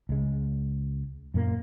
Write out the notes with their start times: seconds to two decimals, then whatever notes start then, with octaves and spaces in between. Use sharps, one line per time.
0.09 C#2 G#3
1.34 F#2 A#2 A#3